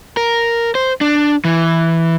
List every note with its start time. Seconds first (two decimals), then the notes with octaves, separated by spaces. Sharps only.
0.17 A#4
0.75 C5
1.01 D4
1.45 E3